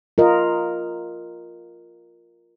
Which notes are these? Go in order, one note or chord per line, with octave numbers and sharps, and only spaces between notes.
F4 A#4 D#5